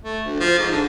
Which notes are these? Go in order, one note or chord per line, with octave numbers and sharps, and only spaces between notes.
A3
D2
F3
G#2
D3